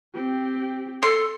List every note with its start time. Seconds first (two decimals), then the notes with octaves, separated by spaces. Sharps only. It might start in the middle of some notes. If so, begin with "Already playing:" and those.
0.15 C4 G4
1.03 A4 C6